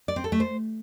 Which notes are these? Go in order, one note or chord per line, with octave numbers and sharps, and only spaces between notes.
D5
C4
A4
A3
C5